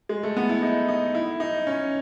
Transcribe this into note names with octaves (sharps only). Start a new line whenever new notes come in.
G#3
A3
B3
E4
D#4
D#4
E4
D#4
C#4